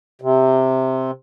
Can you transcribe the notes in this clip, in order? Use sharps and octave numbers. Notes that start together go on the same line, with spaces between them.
C3